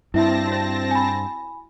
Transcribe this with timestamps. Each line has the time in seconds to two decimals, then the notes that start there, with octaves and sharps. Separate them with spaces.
0.14 G2 C4 E4 E5 A5 B5 A#6
0.47 F#4 C5
0.91 G#5 B5